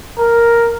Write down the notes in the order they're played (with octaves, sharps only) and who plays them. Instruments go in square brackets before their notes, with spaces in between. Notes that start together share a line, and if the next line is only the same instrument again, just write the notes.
[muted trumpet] A#4